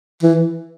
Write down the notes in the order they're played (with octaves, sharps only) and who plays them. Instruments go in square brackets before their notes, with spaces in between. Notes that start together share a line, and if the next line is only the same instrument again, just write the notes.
[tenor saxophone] E3